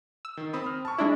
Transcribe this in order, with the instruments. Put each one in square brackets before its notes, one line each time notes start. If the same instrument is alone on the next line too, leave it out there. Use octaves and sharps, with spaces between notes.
[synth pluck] E6
[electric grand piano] D#3
C4 B5 D#6
F6
A5 C#6
[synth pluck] G#3 D4 E4